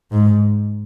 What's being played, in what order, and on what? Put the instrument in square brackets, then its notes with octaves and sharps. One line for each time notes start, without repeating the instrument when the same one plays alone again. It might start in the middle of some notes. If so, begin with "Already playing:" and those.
[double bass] G#2